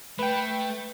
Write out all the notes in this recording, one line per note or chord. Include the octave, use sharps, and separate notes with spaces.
A3 B4 G5